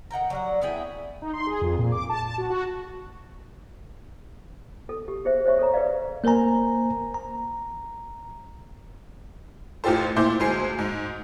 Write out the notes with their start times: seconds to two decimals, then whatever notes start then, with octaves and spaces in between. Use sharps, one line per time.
0.11 D#3 F#5 G5 A#5
0.30 F#3 G3 F#5
0.61 B3 E4 G#4 G5
1.22 D#4
1.33 C6
1.47 G#4
1.62 F2
1.78 A#2
1.92 D6
2.09 A5
2.25 A5
2.38 F#4
2.50 F#4
4.89 A4
5.08 G4
5.25 G#4 C5 E5
5.45 C5 C#5 E5 C#6
5.59 A4 C#5 A#5
5.73 G#4 B4 C#5 D5 F5
6.24 A#3 A#4 C5 G#5 A#5
7.14 A#5
9.84 A1 A2 F4 G4 A4 C5
10.16 A#2 E4 C5 C6 D6 G6
10.40 D2 G#3 C5 G#5 C7
10.79 G#2